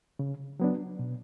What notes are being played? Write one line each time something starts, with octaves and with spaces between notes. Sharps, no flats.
C#3
F#3 B3 D4
B2